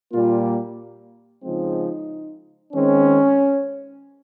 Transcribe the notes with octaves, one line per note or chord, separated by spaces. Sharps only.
A#2 G3 A#3 F4
C#3 F3 G#3 C4 D#4
D#3 G#3 C4 C#4